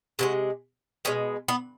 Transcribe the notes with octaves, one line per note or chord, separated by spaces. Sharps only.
C3 E3 G#3 F#4
B2 G#3 C#4
B3